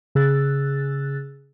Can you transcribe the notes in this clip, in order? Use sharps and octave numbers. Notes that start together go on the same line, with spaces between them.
C#3 G#4 E6 F#6 A6